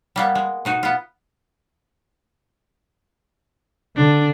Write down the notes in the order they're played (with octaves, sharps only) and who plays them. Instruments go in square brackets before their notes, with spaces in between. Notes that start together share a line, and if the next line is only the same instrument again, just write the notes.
[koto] G3 A#3 B3
G#3
B2 D#4 F#4
B3 F4
[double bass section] D3 [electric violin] D4